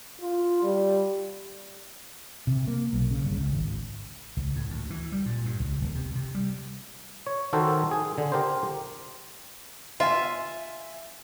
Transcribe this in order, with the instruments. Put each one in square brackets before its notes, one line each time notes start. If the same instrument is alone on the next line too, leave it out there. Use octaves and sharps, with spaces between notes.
[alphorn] F4
G3
[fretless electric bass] C3
A#3
B1
C#3
G1
C#2
G#1
[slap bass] C#2
A2
D2
E3
G3
A#2
G2
C#2
D#1
C3
C3
G3
[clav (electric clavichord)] C#5
D#3 F#4 A4 A#4 C5
G#4
D3
G4 A#4 C5
[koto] F4 [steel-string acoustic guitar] E5 G#5